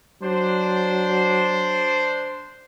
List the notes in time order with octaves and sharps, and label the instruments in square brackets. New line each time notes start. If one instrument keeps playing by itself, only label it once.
[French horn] F#3 [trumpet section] D4 C5